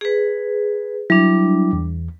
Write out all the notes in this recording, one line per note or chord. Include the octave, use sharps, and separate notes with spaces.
G#4 B4
F#3 G3 D4 E4
E2